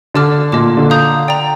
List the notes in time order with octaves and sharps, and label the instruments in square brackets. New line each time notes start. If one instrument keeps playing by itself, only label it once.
[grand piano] D3 [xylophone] D5 A5 D6 F6
[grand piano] A#2 [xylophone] D#5 A5 D6
[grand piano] D3
[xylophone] F5 A#5 D#6 G6
D5 G5 A#5